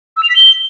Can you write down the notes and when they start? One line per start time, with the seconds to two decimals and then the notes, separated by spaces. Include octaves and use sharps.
0.17 E6
0.23 F7
0.29 B6
0.36 G7